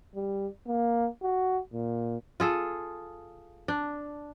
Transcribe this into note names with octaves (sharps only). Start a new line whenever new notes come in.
G3
A#3
F#4
A#2
F4 G#4 A4
D4